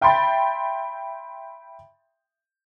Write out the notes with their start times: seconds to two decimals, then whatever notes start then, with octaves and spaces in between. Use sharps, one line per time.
0.01 E5 G5 B5 C6 A6